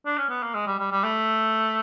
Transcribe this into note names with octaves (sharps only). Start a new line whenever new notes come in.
D4
C#4
B3
A#3
G#3
G3
G3
G3
A3